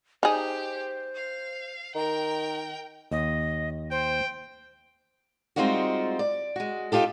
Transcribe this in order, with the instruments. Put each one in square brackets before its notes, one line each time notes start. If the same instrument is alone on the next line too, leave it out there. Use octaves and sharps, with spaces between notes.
[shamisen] D#4 G#4 [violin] G4 [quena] C5
[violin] F5
[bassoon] D#3 [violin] A#4 G5 [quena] A#5
[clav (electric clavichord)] D#2 [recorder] D#5
[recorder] C5 [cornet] G5
[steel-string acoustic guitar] G3 G#3 C4 D#4 F4 F#4
D5
G#3 F#4
D#4 F4 G4 A4